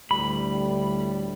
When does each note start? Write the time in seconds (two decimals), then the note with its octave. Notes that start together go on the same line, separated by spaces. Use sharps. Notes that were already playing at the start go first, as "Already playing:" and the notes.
0.11 D2 A2 G3 B5